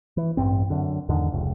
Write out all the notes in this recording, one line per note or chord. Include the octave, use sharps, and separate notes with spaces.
E3
A1 G2 C4
F#2 D3
E2 G#2 D3 D#3
F1 C#2